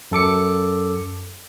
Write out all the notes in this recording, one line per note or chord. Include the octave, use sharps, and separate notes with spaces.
F#2 A4 D6 C#7